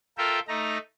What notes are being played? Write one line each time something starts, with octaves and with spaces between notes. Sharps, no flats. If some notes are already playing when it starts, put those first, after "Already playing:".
F4 A4 A#4 E5 G5
A3 D#4 A#5